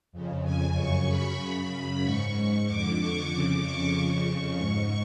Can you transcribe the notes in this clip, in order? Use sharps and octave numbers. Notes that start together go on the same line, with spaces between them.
F2 C#3
G#5
F#2 C#3 C#6
B5
F#2 C#3 B5
G#2 C#6
F2 D3 D6
C#6
F2 C#3 D6
C#6
F2 C#3 C#6
C#6
G#2 C#6